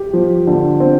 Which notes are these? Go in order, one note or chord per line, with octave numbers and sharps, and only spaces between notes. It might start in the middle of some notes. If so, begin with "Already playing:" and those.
Already playing: G4
F3
D3
C4